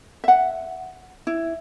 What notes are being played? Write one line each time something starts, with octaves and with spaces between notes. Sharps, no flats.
E5 F#5
E4